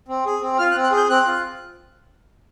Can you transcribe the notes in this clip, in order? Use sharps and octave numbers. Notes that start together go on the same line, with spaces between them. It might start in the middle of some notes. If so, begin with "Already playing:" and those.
C4
G#4
C4
F4 F6
F#6
C4
F#6
G#4
G6
C4 F#6
F4